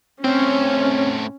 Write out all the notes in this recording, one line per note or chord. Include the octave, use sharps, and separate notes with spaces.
A2 C4 C#4 C5